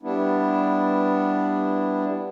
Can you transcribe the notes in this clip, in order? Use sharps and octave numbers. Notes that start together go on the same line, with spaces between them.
G3 B3 D4 E4